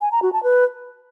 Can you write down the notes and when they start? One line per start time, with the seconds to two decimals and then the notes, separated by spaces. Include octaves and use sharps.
0.01 G#5
0.12 A#5
0.22 F#4
0.33 A5
0.43 B4